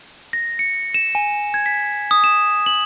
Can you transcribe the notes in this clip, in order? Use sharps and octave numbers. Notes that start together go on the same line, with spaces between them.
A#6
C#7
E7
G#5
G#6
B6
D#6
E7
F#7